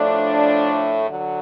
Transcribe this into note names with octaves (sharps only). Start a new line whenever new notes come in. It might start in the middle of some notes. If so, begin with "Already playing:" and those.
Already playing: A2 F3 A3 D4
D3 F#3